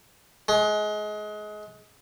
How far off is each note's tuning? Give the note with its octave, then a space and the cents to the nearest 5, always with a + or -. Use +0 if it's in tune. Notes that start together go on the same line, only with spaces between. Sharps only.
G#3 +25